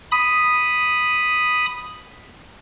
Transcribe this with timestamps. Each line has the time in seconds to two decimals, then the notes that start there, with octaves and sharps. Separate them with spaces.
0.12 B5 D#6